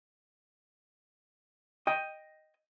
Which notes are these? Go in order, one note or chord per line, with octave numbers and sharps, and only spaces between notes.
D#5 G5